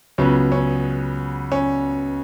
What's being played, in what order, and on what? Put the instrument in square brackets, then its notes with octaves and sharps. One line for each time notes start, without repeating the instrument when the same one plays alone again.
[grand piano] C#2 C#3 F#3 B3 C#4
C#4
C#4